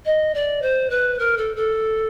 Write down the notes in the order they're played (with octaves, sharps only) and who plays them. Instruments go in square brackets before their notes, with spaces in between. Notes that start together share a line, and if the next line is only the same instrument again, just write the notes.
[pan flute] D#5
D5
C5
B4
A#4
A4
A4